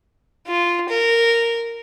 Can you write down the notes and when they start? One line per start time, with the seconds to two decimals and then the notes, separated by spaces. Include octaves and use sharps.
0.47 F4
0.89 A#4